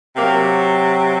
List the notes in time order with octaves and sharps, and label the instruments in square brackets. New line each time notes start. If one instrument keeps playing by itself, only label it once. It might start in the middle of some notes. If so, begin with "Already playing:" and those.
[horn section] C3 F#3 A#3